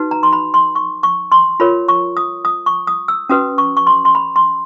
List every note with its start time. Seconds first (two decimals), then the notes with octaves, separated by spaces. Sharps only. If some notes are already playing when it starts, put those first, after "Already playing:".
Already playing: D#4 F#4 B4
0.11 A#5
0.23 C6
0.33 B5
0.54 C6
0.75 C#6
1.03 C#6
1.32 C6
1.60 F4 A#4 C#5 B5
1.88 C#6
2.17 D#6
2.45 D#6
2.66 C#6
2.87 D#6
3.08 E6
3.29 C#4 F#4 B4 D#6
3.58 C#6
3.77 C#6
3.87 C6
4.05 C6
4.15 B5
4.36 C6